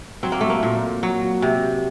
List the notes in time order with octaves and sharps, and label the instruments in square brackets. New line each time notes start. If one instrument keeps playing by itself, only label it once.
[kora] F#3 C4
A#3
A3
A#3
A#2
F#3
C3